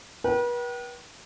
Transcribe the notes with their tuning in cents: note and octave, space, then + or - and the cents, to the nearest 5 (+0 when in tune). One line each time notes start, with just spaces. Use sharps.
B4 -40 G5 -35